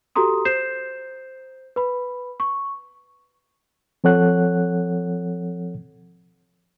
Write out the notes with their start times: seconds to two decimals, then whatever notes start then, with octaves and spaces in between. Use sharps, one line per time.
0.15 F#4 G4 A4 A#5 C6 D#6
0.45 C5 G6 C7 E7
1.76 B4 B5
2.40 C#6
4.04 F3 C4 A4 C#5 F#5 F#6